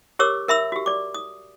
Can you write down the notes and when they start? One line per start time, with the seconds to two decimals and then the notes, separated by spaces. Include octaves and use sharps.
0.19 G4 A#4 C#5 D6 E6
0.48 A#4 E5 B5 E6
0.72 F#4 G4
0.86 D5 D6
1.14 D#6